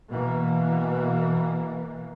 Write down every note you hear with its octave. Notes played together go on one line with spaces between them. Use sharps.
B2 E3 A#3